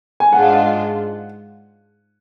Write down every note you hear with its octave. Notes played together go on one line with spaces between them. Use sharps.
G#5
G#2 G#3 D4 F4 F#5